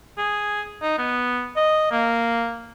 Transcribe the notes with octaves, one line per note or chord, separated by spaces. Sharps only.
G#4
D#4
B3
D#5
A#3